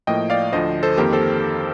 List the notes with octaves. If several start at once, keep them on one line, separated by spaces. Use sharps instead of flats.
A2 F3 A#3 D#5 G5
D5 F5
D2 D3 F3 C5 D#5
A4 C5
F2 D#3 A#3 G4 A#4
A4 C5